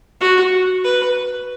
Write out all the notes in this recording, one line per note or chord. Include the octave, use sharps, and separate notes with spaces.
F#4
B4